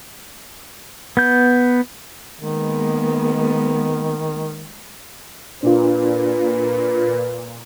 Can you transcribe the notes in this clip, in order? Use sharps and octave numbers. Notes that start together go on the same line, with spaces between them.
B3 G6
D#3 G#3 A#3 B3
A#2 D4 F4 B4